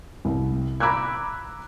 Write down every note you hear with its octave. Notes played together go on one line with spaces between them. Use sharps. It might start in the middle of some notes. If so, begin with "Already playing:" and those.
C2
A#5 B5 D6 E6 F#6 G#6